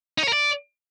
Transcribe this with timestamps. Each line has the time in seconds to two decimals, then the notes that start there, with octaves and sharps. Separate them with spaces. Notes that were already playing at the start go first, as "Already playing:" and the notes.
0.18 D#4
0.23 C#5
0.28 A#4
0.33 D5